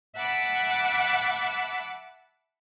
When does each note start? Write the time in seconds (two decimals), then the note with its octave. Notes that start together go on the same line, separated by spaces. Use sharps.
0.16 E5 F#5 A5 B5 D6